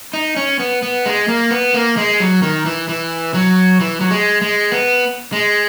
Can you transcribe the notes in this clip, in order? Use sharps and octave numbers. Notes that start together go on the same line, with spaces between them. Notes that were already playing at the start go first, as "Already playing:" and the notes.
D#4
C#4
B3
B3
G#3
A#3
B3
A#3
G#3
F#3
D#3
E3
E3
F#3
E3
F#3
G#3
G#3
B3
G#3